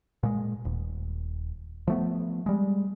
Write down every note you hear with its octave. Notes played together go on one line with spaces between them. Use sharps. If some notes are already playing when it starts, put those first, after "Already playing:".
A#2 G#3
D#1
F3 A3 B3
G3 G#3